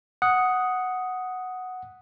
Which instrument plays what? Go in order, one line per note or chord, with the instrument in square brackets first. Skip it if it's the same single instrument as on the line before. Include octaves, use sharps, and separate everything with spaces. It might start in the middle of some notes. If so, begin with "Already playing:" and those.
[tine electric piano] F#5 [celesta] D#6